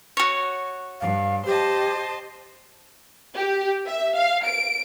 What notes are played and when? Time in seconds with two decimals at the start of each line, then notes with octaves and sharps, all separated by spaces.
0.17 F#4 C#5
1.01 G2 F5
1.46 G4 C5 D#5 A5
3.35 G4
3.86 E5
4.16 F5
4.46 D7